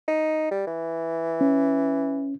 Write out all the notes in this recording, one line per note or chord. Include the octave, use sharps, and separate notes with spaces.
D#4
G3
E3
C#4